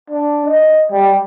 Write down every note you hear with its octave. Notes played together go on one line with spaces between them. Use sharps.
D4
D#5
G3